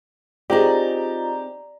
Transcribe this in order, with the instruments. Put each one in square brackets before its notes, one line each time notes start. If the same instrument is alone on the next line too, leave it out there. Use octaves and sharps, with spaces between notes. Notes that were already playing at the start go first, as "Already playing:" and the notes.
[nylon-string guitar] C4 D#4 G#4 [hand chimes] F4 D#5 [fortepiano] G4 [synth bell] D5 A#5